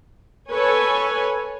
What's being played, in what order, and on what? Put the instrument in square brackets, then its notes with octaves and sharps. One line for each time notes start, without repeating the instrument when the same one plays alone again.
[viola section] A4 B4 C#5 G#5